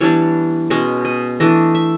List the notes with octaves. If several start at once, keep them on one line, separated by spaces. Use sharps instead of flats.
E3 G3 B3 D4 C#5
B2 G#3 C#4 D#5
D#5
E3 A3 D4 D#5
E5